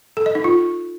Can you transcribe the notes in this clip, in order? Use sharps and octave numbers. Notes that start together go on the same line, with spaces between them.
A4
D#5
D#4
F4